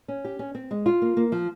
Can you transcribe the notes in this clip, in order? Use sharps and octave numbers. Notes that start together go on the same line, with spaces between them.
C#4
G4
C#4
C4
G#3
F4
A#3
A#3
F3